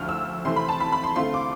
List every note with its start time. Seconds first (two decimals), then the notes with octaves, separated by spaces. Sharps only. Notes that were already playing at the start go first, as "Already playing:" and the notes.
Already playing: D2 D3 F3 F6
0.09 E6
0.45 C3 E3 A3 C4 C6
0.56 B5
0.69 A5
0.80 B5
0.92 B5
1.04 C6
1.16 D3 A3 C4 F4 C6
1.34 D6